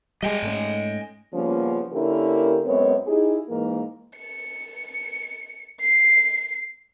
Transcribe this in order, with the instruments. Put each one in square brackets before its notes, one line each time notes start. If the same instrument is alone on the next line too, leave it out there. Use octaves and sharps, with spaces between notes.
[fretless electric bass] G3 G#3 [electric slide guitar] D#5 G5 G#5
[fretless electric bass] G#2 A3 C#4
[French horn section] C#3 F3 G3 A#3 B3 C#4
D3 A#3 C#4 E4 G4 A#4
F#2 G#3 B3 C4 C#5
D#4 E4 G4 G#4
G#2 E3 A#3 A#4
[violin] C#7
C7